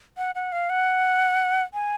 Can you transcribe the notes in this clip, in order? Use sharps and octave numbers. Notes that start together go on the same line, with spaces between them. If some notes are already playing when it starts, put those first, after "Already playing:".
F#5
F#5
F5
F#5
G#5